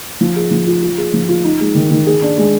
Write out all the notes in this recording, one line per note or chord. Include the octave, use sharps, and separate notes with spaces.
F3
G#4
F3
F4
F4
G#4
F3
F4
D#4
G#3
D#3
D#3
G#4
D4
G#3